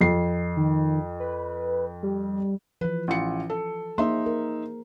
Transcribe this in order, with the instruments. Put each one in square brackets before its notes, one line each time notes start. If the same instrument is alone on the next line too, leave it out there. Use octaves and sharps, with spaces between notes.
[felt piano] F2 C7
[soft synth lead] D#3
B4
G3
[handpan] E3 F3 [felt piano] B4
[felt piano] A1 F4 C#7
A4
[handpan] A#3 G#4 C5 [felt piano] D#4 E5 C6
[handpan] A#4